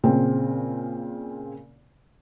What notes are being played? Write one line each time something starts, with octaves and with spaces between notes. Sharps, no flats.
A#2 C#3 C4